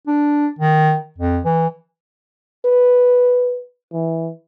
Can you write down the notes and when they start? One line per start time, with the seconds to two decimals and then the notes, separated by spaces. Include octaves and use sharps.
0.07 D4
0.59 D#3
1.18 F2
1.45 E3
2.65 B4
3.93 E3